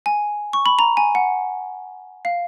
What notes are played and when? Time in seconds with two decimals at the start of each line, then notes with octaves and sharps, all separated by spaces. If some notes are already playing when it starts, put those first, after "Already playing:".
0.06 G#5
0.53 C#6
0.66 B5
0.79 A#5
0.97 G#5
1.15 F#5
2.25 F5